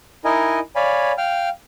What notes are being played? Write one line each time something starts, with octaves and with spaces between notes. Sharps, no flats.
D#4 E4 A#4 D#5 G#5
C#5 D5 F5 G#5 B5
F5 G5 F6